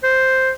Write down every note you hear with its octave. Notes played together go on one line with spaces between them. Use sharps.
C5